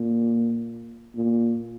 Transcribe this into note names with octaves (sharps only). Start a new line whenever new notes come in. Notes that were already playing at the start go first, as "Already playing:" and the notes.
Already playing: A#2
A#2